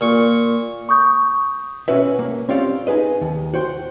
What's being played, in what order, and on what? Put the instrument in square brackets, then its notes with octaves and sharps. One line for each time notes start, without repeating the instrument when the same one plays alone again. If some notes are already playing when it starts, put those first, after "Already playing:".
[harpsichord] A#2 C#6
[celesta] C#6 D#6 G6
[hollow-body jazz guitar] B2 C#4 F#4 B4 E5
A#3
C4 C#4 F4 G4 D5 F5
D#4 G#4 B4 D#5
D#2
F#4 C5 G5